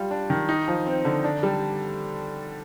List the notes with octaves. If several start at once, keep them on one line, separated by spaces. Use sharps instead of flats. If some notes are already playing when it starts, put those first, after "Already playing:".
Already playing: G3 F4
D4
D#3
D#4
F3
C4
D3
D4
G3